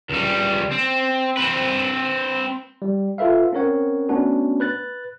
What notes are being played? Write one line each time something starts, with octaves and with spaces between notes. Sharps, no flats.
C#2 G3
C4
C4 B4
G3
F4 A4 B4 E5 F5
C4 C#4 A#4 C#5 F#5
A3 B3 C#4 D4 F#4
B4 F#6 A6